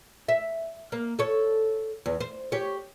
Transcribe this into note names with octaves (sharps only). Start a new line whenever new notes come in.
E5
A#3
A4 C#5
E2
C5
G4 C#5